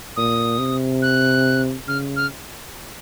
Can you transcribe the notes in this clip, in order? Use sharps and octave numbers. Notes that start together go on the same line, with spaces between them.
A#2 D#6
C3
F#6
C#3 F6
F6